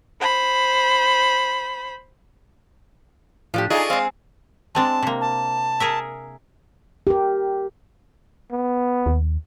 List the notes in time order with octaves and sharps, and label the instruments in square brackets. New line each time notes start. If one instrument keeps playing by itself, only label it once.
[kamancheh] C5 B5
[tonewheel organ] A2 [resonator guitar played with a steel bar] F3 D4 G4
[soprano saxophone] D#4 [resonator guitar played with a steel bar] F4 A4 [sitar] G#4 [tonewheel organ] D5 D#5 C#6
[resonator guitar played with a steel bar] G#3 C4 [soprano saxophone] F5
[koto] G#3 C4 D4 [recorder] A5
[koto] C3 A#3
[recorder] A5
[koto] G#4 A#4 E5
[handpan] G4 A#4
[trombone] B3
[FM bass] D#2